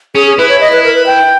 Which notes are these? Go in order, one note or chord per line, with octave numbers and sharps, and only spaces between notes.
C#4 G#4
G#4
E4 B4
C#5
D#5
B4
A#4
B4
G5